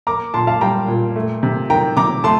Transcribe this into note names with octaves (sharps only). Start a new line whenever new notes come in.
A#3 A#5 D6
A#2 A5 C6
F5 A5
G3 G5 A#5
A#2
A3
C3
D#3 G5 A#5
C3 A#5 D6
A3 A5 C6